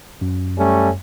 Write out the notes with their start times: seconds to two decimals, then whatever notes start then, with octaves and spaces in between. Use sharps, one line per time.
0.21 F#2
0.58 G3 A3 C#4